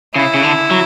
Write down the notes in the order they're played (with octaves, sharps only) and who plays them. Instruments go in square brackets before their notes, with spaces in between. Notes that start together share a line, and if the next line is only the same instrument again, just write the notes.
[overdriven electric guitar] C#3 [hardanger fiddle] E4
[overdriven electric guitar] C#3
D3
F#3